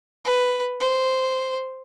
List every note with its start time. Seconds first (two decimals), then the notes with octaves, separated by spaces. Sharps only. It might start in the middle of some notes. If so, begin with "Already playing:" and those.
0.25 B4
0.80 C5